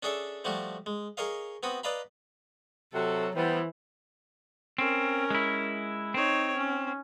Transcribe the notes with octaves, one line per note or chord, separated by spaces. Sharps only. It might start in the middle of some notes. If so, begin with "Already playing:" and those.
C#4 D4 G#4 A4 D5 E5
F3 G3 A3 F#4 G4
G#3
G#4 A#4 C#5 D#5 F5
B3 C4 F#4 B5 D#6
B4 D5 D#5 F5 A#5 B5
C3 F#3 F#4 A4
E3 G3 B3 C5
C4 C#4 A#4
G#3 E4
C4 D#4 C#5
C#4